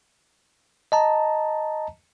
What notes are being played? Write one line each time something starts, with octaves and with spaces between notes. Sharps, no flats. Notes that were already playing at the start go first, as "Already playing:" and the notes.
D#5 A5 A#5